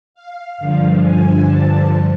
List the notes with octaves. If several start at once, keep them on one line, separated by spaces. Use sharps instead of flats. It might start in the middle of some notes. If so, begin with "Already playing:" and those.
F5
G2 D3 F3
G#5
A5